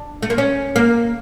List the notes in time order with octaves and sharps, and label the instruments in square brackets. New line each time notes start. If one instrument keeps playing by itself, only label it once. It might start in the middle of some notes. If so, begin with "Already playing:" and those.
Already playing: [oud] D4
A3
A#3
C#4
A#3